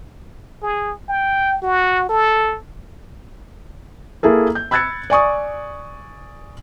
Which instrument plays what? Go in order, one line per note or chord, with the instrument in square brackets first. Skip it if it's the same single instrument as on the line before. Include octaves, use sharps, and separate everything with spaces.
[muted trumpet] G#4
G5
F#4
A4
[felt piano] A#3 E4 G#4 A4
G6
B5 E6 F#6 G#6 A6 C#7
D5 G#5 C#6 D#6